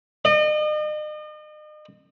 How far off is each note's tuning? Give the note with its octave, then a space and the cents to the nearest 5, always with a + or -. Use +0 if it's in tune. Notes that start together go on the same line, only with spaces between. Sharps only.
D#5 -40